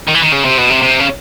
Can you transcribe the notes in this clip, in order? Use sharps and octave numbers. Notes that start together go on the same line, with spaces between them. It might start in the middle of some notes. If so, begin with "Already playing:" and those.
D#3
E3
D#3
C#3
C3
B2
C3
C3
C#3